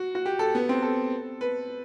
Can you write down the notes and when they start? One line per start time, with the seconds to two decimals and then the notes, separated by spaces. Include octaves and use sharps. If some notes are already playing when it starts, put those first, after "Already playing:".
Already playing: F#4
0.15 F#4
0.26 G4
0.39 A4
0.55 B3
0.69 C4
0.83 A4
1.41 B4